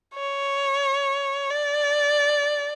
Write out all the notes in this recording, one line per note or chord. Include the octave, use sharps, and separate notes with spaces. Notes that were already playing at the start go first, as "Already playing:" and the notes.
C#5
D5